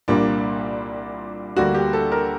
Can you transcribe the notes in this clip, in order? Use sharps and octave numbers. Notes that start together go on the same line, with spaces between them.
C2 A#2 G3 A#3 D4
D2 D3 G3 A#3 F#4
G4
A4
A#4